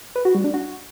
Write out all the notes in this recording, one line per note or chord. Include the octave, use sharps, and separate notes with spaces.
B4
F#4
G3
D4
F#4